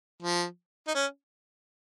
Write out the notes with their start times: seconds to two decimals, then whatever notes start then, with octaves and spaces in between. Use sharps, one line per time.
0.22 F3
0.87 D#4
0.95 C#4